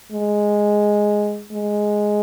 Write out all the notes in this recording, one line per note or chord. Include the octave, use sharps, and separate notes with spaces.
G#3
G#3